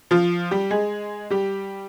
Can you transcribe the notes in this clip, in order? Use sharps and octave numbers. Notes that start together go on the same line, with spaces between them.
F3 F4
G3 G4
G#3 G#4
G3 G4